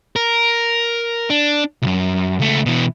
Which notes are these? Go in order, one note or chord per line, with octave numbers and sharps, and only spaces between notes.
A#4
D4
C2 F#2
C#2 A3
B2 E3